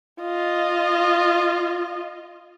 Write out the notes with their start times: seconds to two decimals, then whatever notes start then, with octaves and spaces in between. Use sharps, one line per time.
0.22 F4 D#5